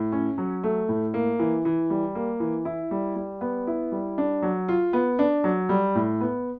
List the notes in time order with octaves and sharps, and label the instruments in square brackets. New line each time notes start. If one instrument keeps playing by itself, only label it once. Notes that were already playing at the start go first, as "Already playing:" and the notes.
Already playing: [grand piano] A2
C#4
F#3
A3
A2
A#3
E3
E3
G3
A#3
E3
E4
G3
G3
B3
E4
G3
D4
F#3
F4
B3
D4
F#3
G3
A2
B3